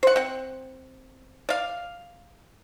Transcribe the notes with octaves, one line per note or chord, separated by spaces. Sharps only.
C5 F#5
C4 F#5
D5 F5